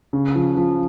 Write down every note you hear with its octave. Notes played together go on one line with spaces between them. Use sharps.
C#3
F3
F3